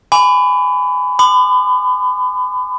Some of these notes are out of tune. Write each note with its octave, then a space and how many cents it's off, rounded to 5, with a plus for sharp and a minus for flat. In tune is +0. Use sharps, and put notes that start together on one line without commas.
G#5 +0 B5 +25 D6 -35
B5 +35 D6 +45